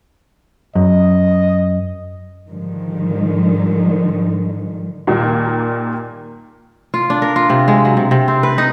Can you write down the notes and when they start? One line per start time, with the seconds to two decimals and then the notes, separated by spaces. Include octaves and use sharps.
0.75 F#2 D#5
2.50 G#2 D3 D#3 F3 G3
5.07 D#2 A#2 D#3 G3 A#3
6.94 F4
7.10 D4
7.22 A#4
7.36 F4
7.50 C3
7.68 G#3
7.85 F#3
7.97 C3
8.11 C3
8.28 C4
8.43 B4
8.58 D#4